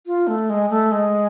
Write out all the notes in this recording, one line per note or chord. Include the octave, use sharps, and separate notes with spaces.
F4
A3
G#3
A3
G#3